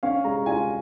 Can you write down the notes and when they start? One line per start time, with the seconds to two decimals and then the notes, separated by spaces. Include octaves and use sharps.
0.03 C#4 F5
0.24 G#3 A#5
0.46 F4 G#5